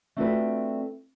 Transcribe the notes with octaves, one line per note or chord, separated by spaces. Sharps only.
A3 C4 D4 F4 F#4 B4